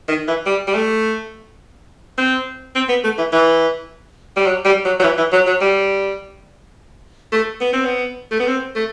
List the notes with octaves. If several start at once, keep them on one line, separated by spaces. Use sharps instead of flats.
D#3
E3
G3
G3
A3
C4
C4
B3
A3
E3
E3
G3
F#3
G3
F#3
F#3
E3
E3
F#3
F#3
G3
A3
B3
C4
B3
A3
B3
C4
A3